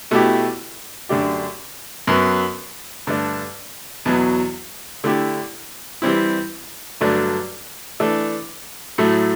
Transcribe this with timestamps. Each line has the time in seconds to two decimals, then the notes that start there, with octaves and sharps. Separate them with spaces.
0.11 B2 A3 E4 G4
1.09 F#2 D3 A3 D4 G4
2.07 F#2 F#3 B3
3.07 G2 D3 A3 D4
4.05 E2 B2 F#3
5.04 D3 A3 E4 G4
6.02 E3 G3 C4 E4
7.01 G2 D3 F#3 A3 D4
8.00 E3 A3 D4 A4
8.98 A2 F#3 A3